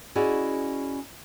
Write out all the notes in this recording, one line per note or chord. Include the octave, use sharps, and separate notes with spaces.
C#4 E4 F#4 G#4 D5 D#5